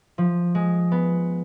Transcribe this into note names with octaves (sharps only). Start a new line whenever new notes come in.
F3
G#3
B3